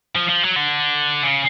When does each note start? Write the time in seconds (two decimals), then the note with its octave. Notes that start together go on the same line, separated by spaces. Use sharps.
0.16 F3
0.29 F3
0.43 F#3
0.56 D3
1.24 C#3